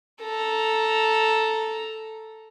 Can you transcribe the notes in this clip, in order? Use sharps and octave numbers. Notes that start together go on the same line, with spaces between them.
A4 A#5